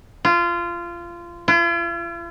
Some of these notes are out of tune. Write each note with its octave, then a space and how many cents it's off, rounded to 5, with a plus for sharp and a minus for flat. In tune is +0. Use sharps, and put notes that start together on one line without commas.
F4 -20
F4 -45